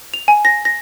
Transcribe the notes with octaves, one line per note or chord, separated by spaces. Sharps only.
F7
G#5
A#6
A#6